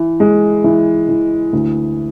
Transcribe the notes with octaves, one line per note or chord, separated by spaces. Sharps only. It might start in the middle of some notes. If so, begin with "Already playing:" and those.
Already playing: E3
G#3
E3
E3
D2